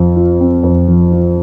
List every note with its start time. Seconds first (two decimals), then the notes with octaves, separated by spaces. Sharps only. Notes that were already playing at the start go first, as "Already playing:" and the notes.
Already playing: F2 F3
0.16 F4
0.40 C4
0.63 F2
0.88 F3
1.12 F4